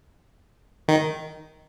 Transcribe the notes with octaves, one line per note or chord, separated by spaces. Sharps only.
D#3